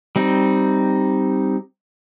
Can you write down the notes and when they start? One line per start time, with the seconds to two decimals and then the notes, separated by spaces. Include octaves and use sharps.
0.16 G3 C4 D#4